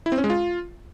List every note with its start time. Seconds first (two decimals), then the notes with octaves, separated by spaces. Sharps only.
0.06 E4
0.12 C4
0.18 C#4
0.24 G#3
0.30 F4